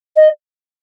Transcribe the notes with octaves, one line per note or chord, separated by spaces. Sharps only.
D#5